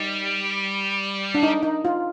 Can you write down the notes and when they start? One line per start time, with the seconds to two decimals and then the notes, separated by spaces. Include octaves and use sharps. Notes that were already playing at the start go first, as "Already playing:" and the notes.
Already playing: G3 D#4
1.35 D4
1.43 D#4
1.63 D#4
1.85 F4